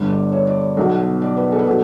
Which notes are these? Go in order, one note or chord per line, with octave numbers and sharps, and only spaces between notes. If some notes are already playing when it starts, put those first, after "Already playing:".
Already playing: G1 G2 D3
D5
C#5
D5
B1 B2 F#3
D5
B4
A4
B4
B2 F#3 A4